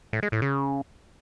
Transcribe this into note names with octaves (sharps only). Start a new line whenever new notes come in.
A2
G#3
A2
C#3